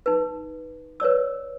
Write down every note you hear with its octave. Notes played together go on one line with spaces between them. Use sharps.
D#4 B4
B4 C#5 D5 E6